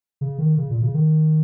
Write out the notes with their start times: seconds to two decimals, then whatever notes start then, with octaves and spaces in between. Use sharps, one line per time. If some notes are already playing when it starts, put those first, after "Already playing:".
0.21 C#3
0.39 D#3
0.57 C#3
0.70 A#2
0.81 C#3
0.94 D#3